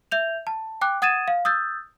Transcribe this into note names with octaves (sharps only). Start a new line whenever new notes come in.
E5 G6 F7
A5
G5 D6 F#6
F#5 D#6 G#6 A6 D#7 E7
F5
D#6 E6 G6 A6